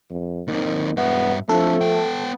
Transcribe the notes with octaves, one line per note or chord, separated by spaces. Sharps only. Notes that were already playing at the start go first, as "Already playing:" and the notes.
F2
D#2 D#3 C4
E1 G2 B3 E5
F3 A3 C4 D4 A4
B3 G5